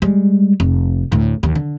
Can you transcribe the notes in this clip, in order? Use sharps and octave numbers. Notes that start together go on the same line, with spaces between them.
G3 G#3
F1
D2 A2
D#2 D#3
D3